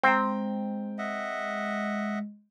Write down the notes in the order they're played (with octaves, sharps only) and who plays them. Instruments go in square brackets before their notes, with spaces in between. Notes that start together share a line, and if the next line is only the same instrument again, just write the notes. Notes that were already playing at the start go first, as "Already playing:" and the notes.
[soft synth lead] G#3 [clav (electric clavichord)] C4 [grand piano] G5 A#5
[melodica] D#5 E5 F#5